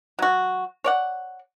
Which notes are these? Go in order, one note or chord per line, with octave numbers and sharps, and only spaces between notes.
F#3 F#4
C#5 D5 F#5